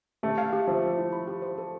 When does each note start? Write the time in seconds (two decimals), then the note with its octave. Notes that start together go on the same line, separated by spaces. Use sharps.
0.23 A3 G4
0.38 F5
0.53 G4
0.67 F3 E5
0.82 E5
0.98 E4
1.13 B5
1.28 G4
1.42 C5
1.58 A4